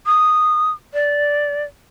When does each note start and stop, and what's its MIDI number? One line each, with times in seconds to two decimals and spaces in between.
0.06 0.71 87
0.94 1.63 74